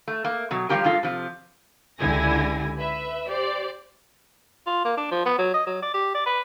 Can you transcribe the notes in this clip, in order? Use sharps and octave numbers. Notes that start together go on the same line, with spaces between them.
A3
A#3
B2 F#3
F3 G3 C#4 F4 G4 A#4
G2 G#3 F4 A4
C3 F3
C#2 D3 E4 G4 G#5 A#6
B4 E5
G4 C5 D5
F4
A#3
D4
F3
B3
F#3
D#5
F#3
D5
G4
D5
B4